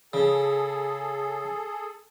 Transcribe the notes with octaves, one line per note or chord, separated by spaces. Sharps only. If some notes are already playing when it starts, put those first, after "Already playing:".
C#3 G#4 A4